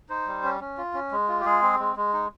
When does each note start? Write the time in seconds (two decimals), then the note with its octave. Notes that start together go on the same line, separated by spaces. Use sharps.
0.09 D#4 C5
0.27 G3
0.44 C#4
0.60 C#4
0.78 F4
0.94 C#4
1.11 G#3
1.28 F4
1.41 G4
1.45 G#3 G#4
1.62 C4
1.79 G#3
1.96 G#3
2.13 D#4